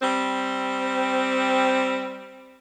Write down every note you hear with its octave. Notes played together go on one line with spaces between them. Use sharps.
G3 C4